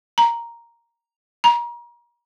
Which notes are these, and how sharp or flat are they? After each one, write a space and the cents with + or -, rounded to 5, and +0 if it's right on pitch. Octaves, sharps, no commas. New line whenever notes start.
A#5 +0
A#5 +35